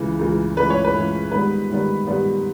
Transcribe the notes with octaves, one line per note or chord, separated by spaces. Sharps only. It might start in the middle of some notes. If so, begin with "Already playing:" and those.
Already playing: C#2 C#3 E3
C#2 C#3 E3
C#2 C#3 E3 B4
C#5
B4
C#2 C#3 E3
G#2 D#3 G3 B3 B4
G#2 D#3 G3 B3
G#2 D#3 G3 B3